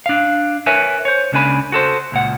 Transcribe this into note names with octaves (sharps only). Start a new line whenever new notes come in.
D4 F5
A#4 B4 C#5 E5 G#5
C5 C#5
C#2 C#3 A#3 D4 G#5 B5
F#4 A4 C5
C#2 A#2 F#5